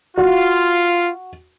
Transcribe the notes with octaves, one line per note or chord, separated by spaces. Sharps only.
F4 F#4